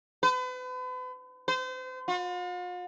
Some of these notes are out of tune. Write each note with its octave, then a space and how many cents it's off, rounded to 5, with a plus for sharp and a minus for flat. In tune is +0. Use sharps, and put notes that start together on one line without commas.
B4 +40
C5 -35
F4 +45